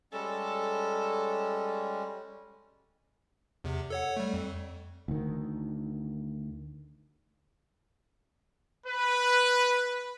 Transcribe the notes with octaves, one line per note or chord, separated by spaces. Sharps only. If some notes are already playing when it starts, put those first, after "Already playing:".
G3 G#3 C#4 A4
E2 C3
A4 C#5 F#5
G3 A3
F2
D2 D#3
B4